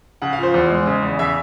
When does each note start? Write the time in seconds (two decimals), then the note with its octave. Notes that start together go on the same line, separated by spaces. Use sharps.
0.22 C#3 F#5
0.33 F5
0.38 F3 C5
0.54 E2
0.70 G#3
0.87 C#3
1.03 E2
1.19 C#3 E5